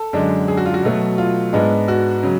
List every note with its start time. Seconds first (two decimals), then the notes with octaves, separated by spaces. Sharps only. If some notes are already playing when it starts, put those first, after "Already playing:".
Already playing: A4
0.13 F#2 D3 G#3 D4
0.48 G#4
0.57 F#4
0.66 F4
0.74 F#4
0.83 B2 F#3 A3
1.18 F4
1.52 G#2 G#3 B3 D4
1.88 F#4
2.23 C#3 F#3